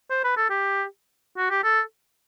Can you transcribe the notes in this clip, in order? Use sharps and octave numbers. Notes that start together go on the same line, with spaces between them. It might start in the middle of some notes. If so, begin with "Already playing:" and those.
C5
B4
A4
G4
F#4
G4
A4